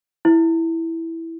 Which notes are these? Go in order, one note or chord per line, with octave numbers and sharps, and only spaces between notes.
E4